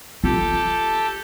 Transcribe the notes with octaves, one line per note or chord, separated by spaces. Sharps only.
F4 G4 A4